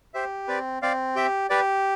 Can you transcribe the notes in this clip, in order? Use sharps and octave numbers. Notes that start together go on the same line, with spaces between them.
G4 C5 E5
C4 B4 D5
C4 D5 F5
G4 E5 G5
G4 B4 D5